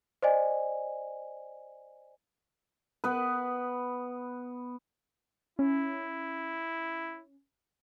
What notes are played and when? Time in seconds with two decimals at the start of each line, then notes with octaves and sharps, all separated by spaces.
0.22 C5 D5 D#5 G#5
3.04 B3 B4
5.59 C#4 E4